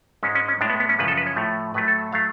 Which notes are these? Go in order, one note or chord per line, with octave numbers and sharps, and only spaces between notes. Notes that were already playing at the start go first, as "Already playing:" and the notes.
G#2 G#3 C#4
C#4
C#4
A2 G#3 D4
B3
B3
C#4
F#2 C#3 F3 G#3 B4
A4
B4
C#5
A2 F3 A3
A2 F#3 A3 B4
A4
F#3 A3 F5